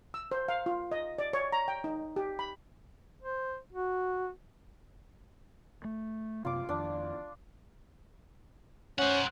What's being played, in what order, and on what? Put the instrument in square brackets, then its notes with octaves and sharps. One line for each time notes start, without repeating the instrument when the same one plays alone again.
[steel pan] E6
C5
F5
F4
D#5
D5
C#5
A#5
G5
D#4
G4
B5
[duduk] C5
F#4
[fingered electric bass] A3
[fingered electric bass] F#2 C3 A#3 [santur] F4 D6
[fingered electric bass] F2 D#3 [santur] D4
[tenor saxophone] C#4 [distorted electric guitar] C5 F#5